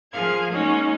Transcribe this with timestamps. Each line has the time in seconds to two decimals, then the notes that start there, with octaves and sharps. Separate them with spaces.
0.11 F3 G#4 A#4 F5 G#6
0.50 G#3 A#3 C#4 D#4 F#4 C#5